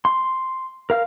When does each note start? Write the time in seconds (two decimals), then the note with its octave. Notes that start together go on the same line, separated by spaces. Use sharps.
0.05 C6
0.90 A#4 F5 F6